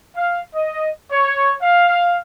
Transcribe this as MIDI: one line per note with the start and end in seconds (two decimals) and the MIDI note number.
0.16 0.41 77
0.54 0.89 75
1.11 1.55 73
1.61 2.19 77